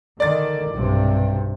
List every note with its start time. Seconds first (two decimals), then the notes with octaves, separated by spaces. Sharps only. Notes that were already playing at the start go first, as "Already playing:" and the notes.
0.20 D3 D#3 D5 A6
0.71 B1 G2 C3